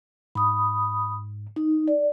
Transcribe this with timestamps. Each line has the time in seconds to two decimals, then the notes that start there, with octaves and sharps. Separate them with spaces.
0.35 G#2 B5 D#6
1.56 D#4
1.88 D5